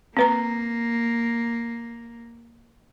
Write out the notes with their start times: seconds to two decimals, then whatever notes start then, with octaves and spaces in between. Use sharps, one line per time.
0.17 A#3 C4 B4 A#5